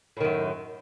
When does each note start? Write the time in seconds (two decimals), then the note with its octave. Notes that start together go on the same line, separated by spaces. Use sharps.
0.17 A2
0.21 D#3
0.24 F#2